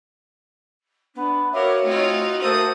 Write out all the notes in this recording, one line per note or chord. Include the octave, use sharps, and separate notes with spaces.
B3 D4
B3 F#4 A#4 C#5 E5 F5 D6
A3 C4 D#4 F4
A3 A#3 A4 C5 D#6